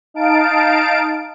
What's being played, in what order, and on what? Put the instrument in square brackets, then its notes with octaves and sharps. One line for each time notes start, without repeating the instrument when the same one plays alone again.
[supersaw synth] D#4 F5 A5 D7